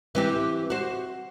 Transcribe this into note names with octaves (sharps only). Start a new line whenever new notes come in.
E3 C4 G4
F#4 C5